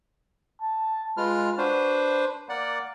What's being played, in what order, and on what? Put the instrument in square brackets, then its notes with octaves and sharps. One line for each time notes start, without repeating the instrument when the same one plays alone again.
[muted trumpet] A5
[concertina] G#3 F4 F6 [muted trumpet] B4
[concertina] D4 B4 C5 [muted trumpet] F#4
[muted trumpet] A#3 [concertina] D5 F#5